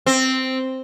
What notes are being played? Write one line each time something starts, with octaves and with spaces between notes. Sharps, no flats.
C4